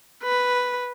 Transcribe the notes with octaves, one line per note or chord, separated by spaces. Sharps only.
B4